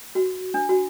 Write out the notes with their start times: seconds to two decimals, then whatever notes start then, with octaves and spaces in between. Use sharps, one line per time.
0.15 F#4
0.54 D4
0.69 F#4